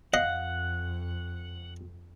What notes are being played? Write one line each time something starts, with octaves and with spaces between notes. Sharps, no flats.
F2 D#5 F5 F#5